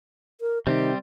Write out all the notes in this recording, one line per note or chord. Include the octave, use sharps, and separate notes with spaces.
A#4
C3 D#3 G3 C4 G4